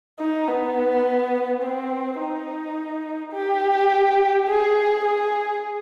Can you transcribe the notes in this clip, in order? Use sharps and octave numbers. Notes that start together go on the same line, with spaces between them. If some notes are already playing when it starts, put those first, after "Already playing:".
D#4
B3
C4
D#4
G4
G#4
G#4